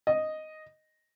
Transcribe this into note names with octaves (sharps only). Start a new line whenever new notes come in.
D#5